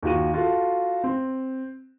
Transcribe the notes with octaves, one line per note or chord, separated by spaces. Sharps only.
D#2 F4 F#4 D#7
F4 F#4 A4
C4